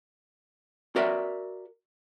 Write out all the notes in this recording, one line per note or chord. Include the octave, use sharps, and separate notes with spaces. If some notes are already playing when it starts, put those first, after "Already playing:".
F#4 A#4 D5 E5